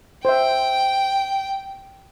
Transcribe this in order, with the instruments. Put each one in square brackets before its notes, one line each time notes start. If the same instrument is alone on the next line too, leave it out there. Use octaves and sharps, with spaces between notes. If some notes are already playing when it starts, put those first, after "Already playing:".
[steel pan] C5 E5 [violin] G5